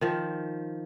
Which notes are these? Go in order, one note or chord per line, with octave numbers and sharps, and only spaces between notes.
D#3 F3